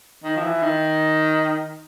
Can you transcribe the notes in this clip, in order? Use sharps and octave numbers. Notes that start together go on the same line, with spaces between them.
D#3
F3
E3
D#3